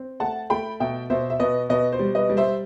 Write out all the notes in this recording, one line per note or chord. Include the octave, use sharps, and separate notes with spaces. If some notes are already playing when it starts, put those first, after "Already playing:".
Already playing: C4
A3 F#5 A5
A3 G5 B5
B2 E5 G5
B2 C5 E5
E5
B2 B4 D#5
B2 B4 D#5
C5
G3
B4 D#5
G3
C5 E5